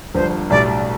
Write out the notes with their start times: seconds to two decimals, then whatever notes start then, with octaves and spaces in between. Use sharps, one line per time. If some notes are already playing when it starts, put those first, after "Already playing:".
0.15 G1 G2 F3 C5
0.50 B1 A2 G3 D5